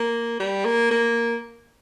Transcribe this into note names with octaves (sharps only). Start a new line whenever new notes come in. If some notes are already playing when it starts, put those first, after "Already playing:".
Already playing: A#3
G3
A#3
A#3